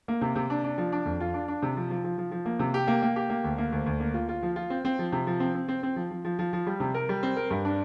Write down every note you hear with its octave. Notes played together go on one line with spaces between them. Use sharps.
A#3
C3
C3
D4
D4
F3
D4
F2
F4
D4
D4
C3
F3
F3
F3
F3
F3
A#3
C3
G4
A#3
A#3
G4
A#3
D2
A#3
D2
D2
A#3
F4
F4
F3
F4
C4
C4
F3
C3
F3
C4
C4
C4
C4
F3
F3
F3
F3
F3
G3
C3
A#4
G3
C4
A#4
G2
D4